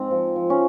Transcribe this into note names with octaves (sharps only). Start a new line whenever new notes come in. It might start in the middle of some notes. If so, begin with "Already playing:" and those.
Already playing: G#2 C4
F3
F3
C#4